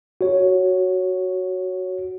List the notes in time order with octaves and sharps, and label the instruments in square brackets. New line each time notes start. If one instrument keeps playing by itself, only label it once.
[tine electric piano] F#4 C#5